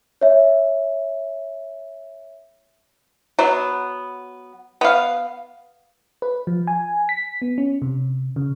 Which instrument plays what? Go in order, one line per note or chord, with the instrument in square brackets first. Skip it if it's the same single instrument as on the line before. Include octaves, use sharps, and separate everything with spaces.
[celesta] C#5 E5
[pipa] F#3 B3
B3 F5
[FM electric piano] B4
F3
G#5
B6
B3
C#4
C3
C#3